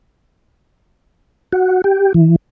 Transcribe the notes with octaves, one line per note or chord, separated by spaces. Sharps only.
F#4
G4
E3